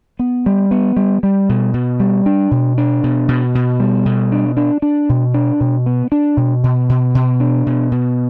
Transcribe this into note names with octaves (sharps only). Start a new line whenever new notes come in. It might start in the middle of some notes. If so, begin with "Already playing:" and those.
B3
G3
B3
G3
G3
B2
B2
G3
D4
B2
D4
B2
B2
B2
G3
B2
D4
D4
D4
B2
D4
B2
B3
D4
B2
B2
B2
B2
D4
B2
B2